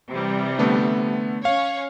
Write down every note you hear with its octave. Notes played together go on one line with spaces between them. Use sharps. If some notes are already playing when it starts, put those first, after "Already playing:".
C3 E3 G3
D3 A3 B3
C#4 C#5 F5